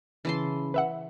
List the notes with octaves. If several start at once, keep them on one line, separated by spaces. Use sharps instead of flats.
C#3 E3 A5 C6
B4 E5 F#5